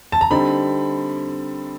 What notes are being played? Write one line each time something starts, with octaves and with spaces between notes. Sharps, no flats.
A5
A#5
D3 G3 C4 D#4 B5